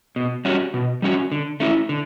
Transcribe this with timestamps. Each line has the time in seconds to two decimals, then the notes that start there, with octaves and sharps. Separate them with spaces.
0.16 B2
0.45 G3 C#4 F#4
0.74 B2
1.02 G3 C#4 F#4
1.32 D3
1.60 A3 C#4 E4
1.89 D3